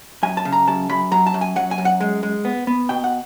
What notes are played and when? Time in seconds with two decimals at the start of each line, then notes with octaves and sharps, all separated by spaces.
0.23 F#2 G#5
0.37 A5
0.45 C#3
0.52 A#5
0.68 F#2 A5
0.89 F#2 B5
1.12 F#3 A#5
1.27 A5
1.34 F#2
1.41 G#5
1.56 F#3 F#5
1.71 G#5
1.78 F#2
1.85 F#5
2.00 G#3
2.23 G#3
2.45 B3
2.67 B3
2.89 B2 G5
3.04 F#5